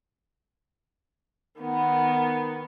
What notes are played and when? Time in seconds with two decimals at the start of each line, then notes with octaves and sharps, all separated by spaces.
1.61 D#3 B3